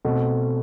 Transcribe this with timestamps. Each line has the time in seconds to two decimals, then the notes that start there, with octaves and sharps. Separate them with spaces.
0.05 B2 A3 C4